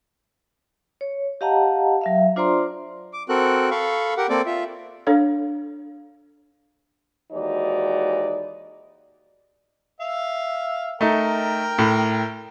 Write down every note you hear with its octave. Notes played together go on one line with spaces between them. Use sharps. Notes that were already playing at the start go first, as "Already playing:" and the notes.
C#5
G4 D#5 F5 F#5 A5 A#5
F#3 E5 F5
D4 F4 C5 D5 A#5 C6
D6
C4 F#4 A4 A#4 F#6
A4 F5 B5 C#6
G4 A#4 F#5
A#3 C4 A4 D5 D6
F4 E5
D4 A4 C#5 F5
D#2 E3 G#3 D#4 F#4 D5
E5 F5
A3 D#4 A#4 G5
A2